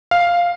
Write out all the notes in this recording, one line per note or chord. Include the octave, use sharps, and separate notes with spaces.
F5